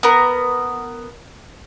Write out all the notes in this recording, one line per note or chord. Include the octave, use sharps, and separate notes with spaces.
B3 A#4